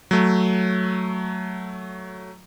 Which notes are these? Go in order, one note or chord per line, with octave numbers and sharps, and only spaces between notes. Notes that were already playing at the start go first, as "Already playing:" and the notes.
F#3 A3